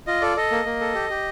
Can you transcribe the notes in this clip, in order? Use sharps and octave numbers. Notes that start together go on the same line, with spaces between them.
F4 D#5
A4 D5
A4 D#5
A#3
A#3
A4
G4
G4